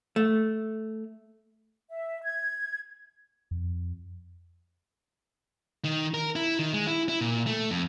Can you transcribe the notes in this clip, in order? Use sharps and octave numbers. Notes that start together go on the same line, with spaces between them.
A3
E5
G#6
F2
D#3
A#4
E4
D#3
G#3
E4
E4
A#2
A3
F2